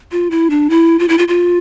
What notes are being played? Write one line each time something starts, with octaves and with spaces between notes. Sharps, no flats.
F4
E4
D4
E4
F4
E4
F4
F4